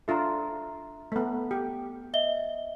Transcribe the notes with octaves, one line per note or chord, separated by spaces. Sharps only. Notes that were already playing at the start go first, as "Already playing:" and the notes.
D4 F4 A4 E5 A#5
A3 B3
G4
D#5 E5 G7